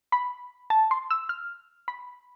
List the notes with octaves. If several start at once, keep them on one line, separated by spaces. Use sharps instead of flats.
B5
A5
C6
E6
F6
B5